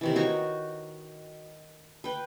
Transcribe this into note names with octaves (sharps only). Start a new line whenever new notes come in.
C3 D#3 E3
D#4 F#4 C#5 C#6
B4 G5